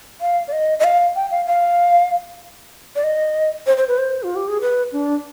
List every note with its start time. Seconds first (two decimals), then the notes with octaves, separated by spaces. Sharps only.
0.21 F5
0.48 D5
0.53 D#5
0.79 D#5
0.84 F5
1.15 G5
1.31 F5
1.46 F5
2.96 D5
3.04 D#5
3.67 C5
3.77 C5
3.88 B4
3.98 C5
4.23 F4
4.36 G4
4.48 G#4
4.61 B4
4.92 D4